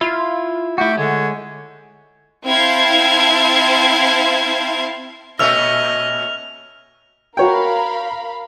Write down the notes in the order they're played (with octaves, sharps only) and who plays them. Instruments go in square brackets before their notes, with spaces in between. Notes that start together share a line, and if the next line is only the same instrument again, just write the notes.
[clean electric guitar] E4 [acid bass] F4
[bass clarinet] A3 [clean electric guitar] E4 F#4 [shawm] G4
[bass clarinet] D3 [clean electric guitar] G#3 [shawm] C#5
[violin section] C4 E4 C5 F5 A5 G#6
[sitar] A#2 A3 C#4 [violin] D#5 [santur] E5 [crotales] F6 F7
[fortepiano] F#4 C#5 G5 [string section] A#4 F5 B5